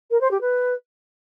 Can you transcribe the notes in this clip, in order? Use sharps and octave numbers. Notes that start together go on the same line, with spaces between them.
A#4
C5
G4
B4